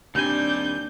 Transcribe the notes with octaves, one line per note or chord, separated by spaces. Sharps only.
D#2 G3 C4 D4 G#5 G6